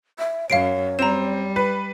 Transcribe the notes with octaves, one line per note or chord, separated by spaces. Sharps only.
E5
F#2 C#5 F5 C7 D7
G3 C4 A#5 E7
B4